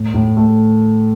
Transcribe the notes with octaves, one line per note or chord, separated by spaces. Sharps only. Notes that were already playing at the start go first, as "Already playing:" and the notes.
Already playing: A2
A2
A3